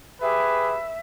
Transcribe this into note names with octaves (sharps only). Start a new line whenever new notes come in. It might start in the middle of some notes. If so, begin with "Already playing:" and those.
G4 G#4 B4 E5